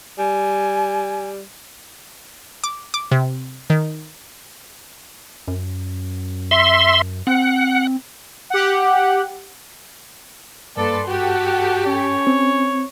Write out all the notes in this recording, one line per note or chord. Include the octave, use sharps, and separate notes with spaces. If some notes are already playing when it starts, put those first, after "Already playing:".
G3 G#5
D6
D6
C3
D#3
F#2
E5 C6
C4 F#5
G4 F#5
G2 A#3 A4 B4 D5 C6
F#4 G4 A4 F#5
C#4 C#5
C4